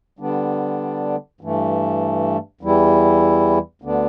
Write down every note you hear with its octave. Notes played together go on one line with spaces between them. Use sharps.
D3 G3 B3 D4
G2 E3 A3
E2 E3 G3 E4
D2 D3 B3 D4